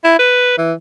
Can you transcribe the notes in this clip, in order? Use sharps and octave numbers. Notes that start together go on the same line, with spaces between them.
E4
B4
E3